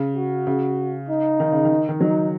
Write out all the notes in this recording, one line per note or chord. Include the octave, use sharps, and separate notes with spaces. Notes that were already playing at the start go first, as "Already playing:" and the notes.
Already playing: C#3
F#4
C#3
D#4
D#3
C#3
D#3
D#3
F#3 D#4